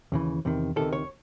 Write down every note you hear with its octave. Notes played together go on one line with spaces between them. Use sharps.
D#2 C#3 E3
E2 C3 D#3
C#2 C3 D#3 A4
C#5